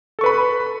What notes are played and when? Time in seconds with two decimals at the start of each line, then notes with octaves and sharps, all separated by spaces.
0.19 A4
0.21 C#6
0.24 B4
0.26 B5